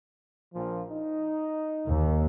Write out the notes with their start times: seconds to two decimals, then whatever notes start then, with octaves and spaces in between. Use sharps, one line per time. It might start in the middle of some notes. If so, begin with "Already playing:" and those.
0.54 A#1 A#2 F3
0.91 D#4
1.87 D#2